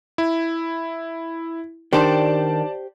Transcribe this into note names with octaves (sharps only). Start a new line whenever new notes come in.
E4
D#3 D4 G4 C5 D5 A5